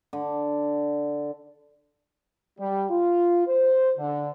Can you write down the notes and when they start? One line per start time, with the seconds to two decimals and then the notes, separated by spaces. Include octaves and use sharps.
0.13 D3
2.59 G3
2.90 F4
3.47 C5
3.98 D3